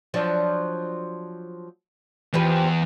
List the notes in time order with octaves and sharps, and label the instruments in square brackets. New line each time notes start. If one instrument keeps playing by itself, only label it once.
[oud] F3 F#3 D4
[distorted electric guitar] E2 [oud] F3 G4 B4